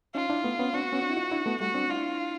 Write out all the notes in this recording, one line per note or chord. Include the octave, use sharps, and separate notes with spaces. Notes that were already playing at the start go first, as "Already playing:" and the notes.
C#4 D#4 F4
D4 E4
A3 B3
B3 C#4
C4 D4 F#4
B3 C#4
C4 D4
E4
D#4 F4
D4 E4
A3 B3
G3 A3 F#4
C4 D4
D4 E4 F4